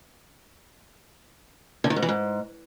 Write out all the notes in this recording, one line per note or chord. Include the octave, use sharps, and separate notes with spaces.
D3
D#3
G#2
E3
G#2